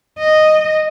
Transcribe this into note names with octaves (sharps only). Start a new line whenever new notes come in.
D#5